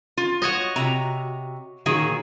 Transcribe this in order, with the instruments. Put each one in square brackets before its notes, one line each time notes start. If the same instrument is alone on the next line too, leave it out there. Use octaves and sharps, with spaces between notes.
[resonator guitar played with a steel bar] F4
[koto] F#4 C#5 D#5
[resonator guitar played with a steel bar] C3 A#5
[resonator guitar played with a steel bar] A#2 D#3 F#3 [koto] G#4